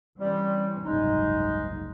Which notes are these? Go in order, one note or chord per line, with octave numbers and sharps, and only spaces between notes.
E3 G3 C4 C#4
F#1 C2 G#2 G#3 D#4